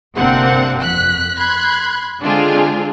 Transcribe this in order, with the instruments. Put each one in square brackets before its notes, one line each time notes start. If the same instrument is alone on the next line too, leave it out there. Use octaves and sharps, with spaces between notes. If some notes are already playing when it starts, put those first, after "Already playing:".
[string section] G1 C3 A#3 C4 D4 F#5
F2 F#6 B6
B5 C6 F#6 G#6
D3 G#3 C4 D4 F4 G#4